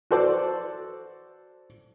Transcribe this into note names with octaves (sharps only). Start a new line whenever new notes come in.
F#4 A4 C5 D5